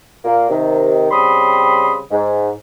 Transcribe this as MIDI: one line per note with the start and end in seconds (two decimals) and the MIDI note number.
0.24 0.46 46
0.24 0.46 58
0.49 1.06 48
0.49 1.06 51
1.10 1.99 49
1.10 1.99 55
1.10 1.99 60
1.10 1.99 83
1.10 1.99 84
1.10 1.99 87
2.11 2.49 44